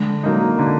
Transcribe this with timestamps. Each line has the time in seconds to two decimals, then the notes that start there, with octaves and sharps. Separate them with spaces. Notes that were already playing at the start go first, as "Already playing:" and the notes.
Already playing: D3 G#3
0.23 F#3 A#3 D#4
0.59 D3